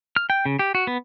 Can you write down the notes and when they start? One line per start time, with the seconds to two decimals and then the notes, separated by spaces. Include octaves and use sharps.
0.16 F6
0.30 G5
0.46 C#3
0.59 G4
0.75 F#4
0.87 B3